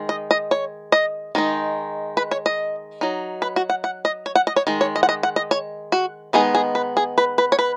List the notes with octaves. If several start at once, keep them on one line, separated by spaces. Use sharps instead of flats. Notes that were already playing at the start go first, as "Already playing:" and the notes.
Already playing: D#3 G#3
D#5
D#5
C#5
D#5
D#3 G#3 D#4
B4
C#5
D#5
F#3 D#4
B4
F#4
F#5
F#5
D#5
C#5
F#5
D#5
C#5
D#3 G#3
C#5
D#5
F#5
D#5
F#5
D#5
C#5
F#4
D#3 G#3 B3 D#4 G#4
G#4
B4
G#4
B4
B4
C#5
B4